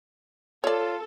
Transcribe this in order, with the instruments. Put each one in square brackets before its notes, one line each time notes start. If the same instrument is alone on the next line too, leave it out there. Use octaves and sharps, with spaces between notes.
[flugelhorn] F4 [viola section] A4 [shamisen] C#5 D5